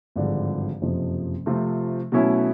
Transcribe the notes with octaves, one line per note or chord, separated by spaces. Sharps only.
G#1 G2 D3 F3 G#3
F#1 F2 C3 F3
C3 F3 A3 C4 F4
B2 F#3 A3 C#4 E4